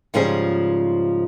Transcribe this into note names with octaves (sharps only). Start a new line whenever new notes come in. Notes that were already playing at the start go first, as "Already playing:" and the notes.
G#2 C#3 F3 G3 G#4